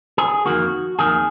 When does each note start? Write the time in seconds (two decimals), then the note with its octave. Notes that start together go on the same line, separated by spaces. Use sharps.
0.18 G#4
0.45 F2 D#3 A#3 F#4
0.99 F2 D#3 A#3 G#4